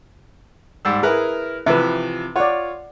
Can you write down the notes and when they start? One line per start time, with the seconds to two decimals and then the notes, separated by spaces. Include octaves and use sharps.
0.85 G#2 G3 E6
1.03 E4 G#4 A#4 B4
1.66 C3 E3 F3 B4 E5
2.36 F4 C#5 D5 F#5